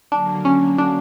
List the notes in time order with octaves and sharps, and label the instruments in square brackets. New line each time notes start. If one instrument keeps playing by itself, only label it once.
[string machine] D3 F#3 A#3 [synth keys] D4
[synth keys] C#4
D4